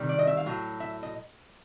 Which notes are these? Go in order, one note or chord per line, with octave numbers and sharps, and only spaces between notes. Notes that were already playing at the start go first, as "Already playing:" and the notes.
Already playing: C3 D#3 G3
D5
D#5
E5
F5
A2 F#3
E5
D#5